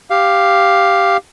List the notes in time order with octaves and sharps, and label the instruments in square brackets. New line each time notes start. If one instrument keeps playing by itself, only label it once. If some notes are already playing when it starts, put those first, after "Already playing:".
[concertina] G4 F5